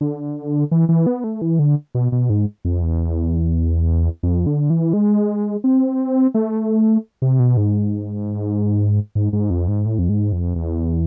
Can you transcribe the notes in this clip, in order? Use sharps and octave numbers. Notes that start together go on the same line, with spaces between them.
D3
E3
E3
B3
A3
E3
D3
B2
B2
G#2
F2
E2
F2
D3
E3
G#3
C4
A3
C3
B2
G#2
G#2
G#2
F2
G#2
A2
F2
G#2
F2
E2